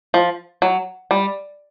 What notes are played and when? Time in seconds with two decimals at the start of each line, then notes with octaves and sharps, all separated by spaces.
0.14 F3
0.62 F#3
1.11 G3